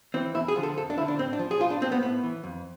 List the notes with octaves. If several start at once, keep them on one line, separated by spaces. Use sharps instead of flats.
E3 C4
E2 E4
G#4
D3 F3
A4
F2 A4
D4
D3 F3 E4
D4
A2 C4
D4
F3
G#4
A2 F4
D4
F3 C4
B3
A2 B3
E3
F2